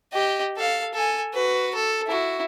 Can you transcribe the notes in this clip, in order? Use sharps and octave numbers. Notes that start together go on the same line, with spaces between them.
G4 D#5
A4 F5
A4 G#5
F#4 B4
A4
E4 F#4